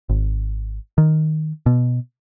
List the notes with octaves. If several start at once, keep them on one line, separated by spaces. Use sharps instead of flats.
G#1
D#3
B2